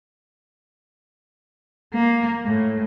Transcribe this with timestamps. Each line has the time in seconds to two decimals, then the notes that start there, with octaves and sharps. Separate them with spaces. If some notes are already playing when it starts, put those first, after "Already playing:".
1.94 A#3
2.45 A2